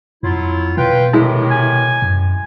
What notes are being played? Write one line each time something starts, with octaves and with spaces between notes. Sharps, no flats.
F2 F#3 E4 F4
B2 F4 B4 G5
A2 C3 D#3 G#3 E4
G#5
F#2